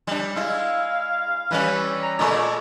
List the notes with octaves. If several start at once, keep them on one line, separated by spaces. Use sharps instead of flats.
G3 D4
G#3 E4 F5
E3 G3 C#4 B4
A#5
A#2 G#3 A3 D5